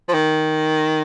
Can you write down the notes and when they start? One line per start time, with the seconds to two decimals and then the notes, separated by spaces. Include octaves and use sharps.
0.08 F3
0.13 D#3